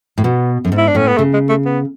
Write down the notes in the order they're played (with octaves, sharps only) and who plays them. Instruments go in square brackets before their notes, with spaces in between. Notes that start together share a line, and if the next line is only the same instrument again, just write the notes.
[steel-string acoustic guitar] A2
[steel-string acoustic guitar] B2 [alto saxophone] B3
[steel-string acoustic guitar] F#2
G#2
[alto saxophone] E4
D4
[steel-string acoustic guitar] A2 [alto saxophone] C#4
[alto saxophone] B3
[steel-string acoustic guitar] C#3 [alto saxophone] A3
[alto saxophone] G#3
A3
B3